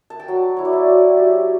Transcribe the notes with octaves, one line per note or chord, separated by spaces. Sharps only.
A5
G5
F#3 F#5
E4 C#5
D5
E5
F#3
F#3 G4